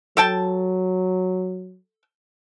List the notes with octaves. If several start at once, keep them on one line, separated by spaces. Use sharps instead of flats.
F#3 A4 G5 A5